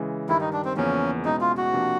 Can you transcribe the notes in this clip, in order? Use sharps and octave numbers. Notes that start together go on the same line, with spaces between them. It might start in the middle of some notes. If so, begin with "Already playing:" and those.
Already playing: C#3 E3 G#3
G2 D#3 G3 E4
D#4
D4
C4
E2 C#3 F3 A#3 C#4
B2 G#3 C#4 D#4 E4
F4
F#4
C3 F3 A#3 D4